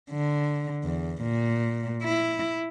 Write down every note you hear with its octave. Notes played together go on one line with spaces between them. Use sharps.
D3
E2
A#2
E4